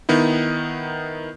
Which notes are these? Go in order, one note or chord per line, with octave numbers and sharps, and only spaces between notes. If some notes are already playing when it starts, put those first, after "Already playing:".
D#3 B3 D#4 E4